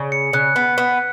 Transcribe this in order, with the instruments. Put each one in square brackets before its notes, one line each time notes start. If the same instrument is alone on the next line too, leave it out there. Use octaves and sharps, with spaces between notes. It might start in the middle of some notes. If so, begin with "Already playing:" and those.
Already playing: [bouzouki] C#3
[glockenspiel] C#7
[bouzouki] C#3 [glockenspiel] F#6
[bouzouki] B3 [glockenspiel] B6
[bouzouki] B3 [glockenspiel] B6